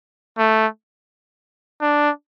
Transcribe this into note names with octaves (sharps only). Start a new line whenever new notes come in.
A3
D4